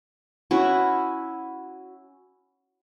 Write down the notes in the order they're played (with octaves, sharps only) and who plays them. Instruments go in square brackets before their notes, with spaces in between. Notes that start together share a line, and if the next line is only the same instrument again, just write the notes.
[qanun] C#4 E4 F#4